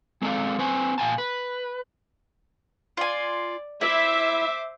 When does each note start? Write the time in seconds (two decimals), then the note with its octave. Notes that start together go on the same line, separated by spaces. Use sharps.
0.22 G#3 C4 A4 C5 D5 F5
0.59 C4 B4 C5 G#5
0.98 A#2 F5 G#5 A5
1.18 B4
2.97 F4 D5 G#5
3.81 E4 C5 E5 D6